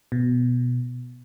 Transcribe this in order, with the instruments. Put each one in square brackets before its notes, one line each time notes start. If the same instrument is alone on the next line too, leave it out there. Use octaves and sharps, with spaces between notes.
[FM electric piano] B2